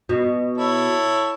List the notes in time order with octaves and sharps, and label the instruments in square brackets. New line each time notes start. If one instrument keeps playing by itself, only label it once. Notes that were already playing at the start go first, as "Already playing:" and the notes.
[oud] B2
[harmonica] E4 A4 C#5